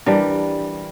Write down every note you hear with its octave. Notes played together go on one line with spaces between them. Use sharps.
E3 G3 D4 A#4